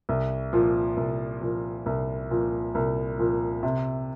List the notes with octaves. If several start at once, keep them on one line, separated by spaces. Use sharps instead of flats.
C2
A#2 F3
C2
A#2 F3
C2
A#2 F3
C2
A#2 F3
C3